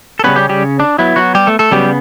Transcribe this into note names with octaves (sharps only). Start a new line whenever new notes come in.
A4
C#3 G3 B3 C#4 B4
G3 G4
G3 G4
D4
F#3 B3 E4
F#3 F#4
G3 G4
A3 A4
A3 A4
C#3 F#3 G3 B3 G4